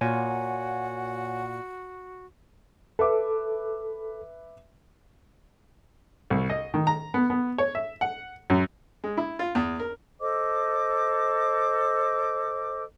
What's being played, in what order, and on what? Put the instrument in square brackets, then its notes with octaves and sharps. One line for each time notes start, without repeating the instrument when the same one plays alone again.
[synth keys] A#2 [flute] F#4 [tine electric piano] C#5 G#5 [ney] F#5
[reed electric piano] A4 [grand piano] B4 E5 D6
[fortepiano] C2
D#5
D#3
A#5
B3
B3
C#5
E5
F#5
F#2
G#3
E4
F4
E2
A#4
[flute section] A4 C5 D#5 D6